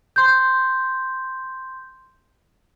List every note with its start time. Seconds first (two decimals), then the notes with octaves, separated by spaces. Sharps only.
0.16 C6 G6